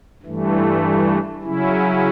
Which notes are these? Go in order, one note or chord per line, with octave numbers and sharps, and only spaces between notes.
G2 E3 A3
C#3 F#3 C#4 E4